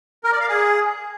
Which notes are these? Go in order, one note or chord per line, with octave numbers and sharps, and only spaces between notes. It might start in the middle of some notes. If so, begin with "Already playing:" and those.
A#4
D5
F5
G#4